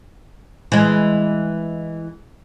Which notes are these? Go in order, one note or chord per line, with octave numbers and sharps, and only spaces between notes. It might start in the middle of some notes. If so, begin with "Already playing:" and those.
E3 G#3